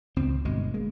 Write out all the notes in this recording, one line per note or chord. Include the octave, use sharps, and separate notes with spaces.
C#2 C4
G1 B2 G#3
G#3 A#3